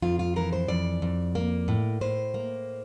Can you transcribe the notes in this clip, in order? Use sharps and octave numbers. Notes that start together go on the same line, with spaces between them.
F2 F4
F4
E3 A#4
C5
F2 D5
F2
A#3
A2
A2 C5
A#3